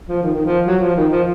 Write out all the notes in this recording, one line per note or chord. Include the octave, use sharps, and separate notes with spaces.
F3
D#3
D#3
F3
F#3
F3
D#3
F3